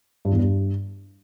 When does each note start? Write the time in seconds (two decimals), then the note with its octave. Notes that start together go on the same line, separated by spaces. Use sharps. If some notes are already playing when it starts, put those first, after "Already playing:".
0.25 G2
0.32 E2
0.39 G2